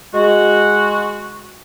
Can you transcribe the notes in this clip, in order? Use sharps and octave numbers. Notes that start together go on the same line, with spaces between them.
G#3 F#4